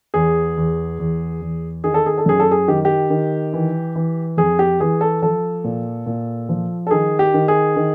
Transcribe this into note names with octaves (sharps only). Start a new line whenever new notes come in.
E2 G#4
E2
E2
E2
D#3 G#4
A4
G#4
A4
F#2 G#4
A4
G#4
D#3 G4
G4
D#3
E3
E3
F2 G#4
G4
E3 G#4
A4
F3 A4
A#2
A#2
F3
A4
D#3 G#4
G4
D#3
G#4
D#3